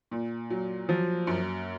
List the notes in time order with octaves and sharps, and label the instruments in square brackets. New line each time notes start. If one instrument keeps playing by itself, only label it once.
[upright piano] A#2
F#3
[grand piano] F3 [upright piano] F#3
[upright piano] F#2